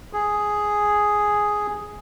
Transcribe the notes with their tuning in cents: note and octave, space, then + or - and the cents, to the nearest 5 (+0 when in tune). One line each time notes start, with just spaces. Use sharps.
G#4 +0